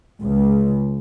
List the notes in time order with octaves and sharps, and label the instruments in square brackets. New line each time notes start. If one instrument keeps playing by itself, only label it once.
[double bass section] C#2